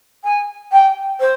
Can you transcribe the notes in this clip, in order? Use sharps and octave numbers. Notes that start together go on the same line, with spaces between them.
G#5
G5
C5